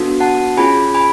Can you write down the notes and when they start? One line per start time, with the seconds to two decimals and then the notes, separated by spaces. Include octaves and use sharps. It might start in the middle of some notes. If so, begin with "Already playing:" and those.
Already playing: B3 D4 F#4 A4
0.20 F#5 A5
0.57 C#4 F4 G#4 G#5 B5
0.94 G#5 B5